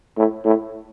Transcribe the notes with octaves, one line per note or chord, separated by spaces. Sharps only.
A2
A2